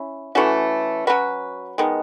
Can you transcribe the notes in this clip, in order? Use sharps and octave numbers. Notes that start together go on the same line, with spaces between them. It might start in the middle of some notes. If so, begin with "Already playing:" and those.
Already playing: C#4 E4
E3 A3 C#4 F#4
F#3 C#4 F#4 B4
D#3 G#3 B3